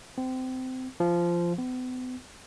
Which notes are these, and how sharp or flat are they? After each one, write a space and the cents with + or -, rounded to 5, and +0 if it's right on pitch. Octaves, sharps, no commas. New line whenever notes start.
C4 -25
F3 -15
B3 +45